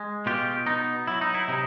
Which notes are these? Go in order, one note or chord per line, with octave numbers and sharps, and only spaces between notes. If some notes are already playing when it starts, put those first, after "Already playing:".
Already playing: G#3
B2 F4 G4
B3 D#4
F#3 E4
D#4
E4
C3 D#4